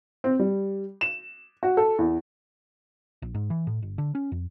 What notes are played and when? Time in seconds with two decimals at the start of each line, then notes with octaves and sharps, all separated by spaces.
0.24 C4
0.39 G3
1.01 E7
1.63 F#4
1.77 A4
1.98 E2
3.22 A#1
3.34 G#2
3.50 E3
3.67 A2
3.82 G1
3.98 D3
4.15 C#4
4.32 F2